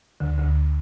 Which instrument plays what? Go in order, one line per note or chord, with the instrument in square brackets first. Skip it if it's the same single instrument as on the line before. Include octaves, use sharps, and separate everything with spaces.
[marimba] D2 D3
D2 D3